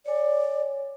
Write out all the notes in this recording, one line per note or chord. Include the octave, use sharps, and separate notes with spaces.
C#5 D5 G#5